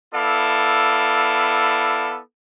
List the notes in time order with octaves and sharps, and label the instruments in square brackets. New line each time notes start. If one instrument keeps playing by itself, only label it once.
[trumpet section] B3 E4 A4 D5 F5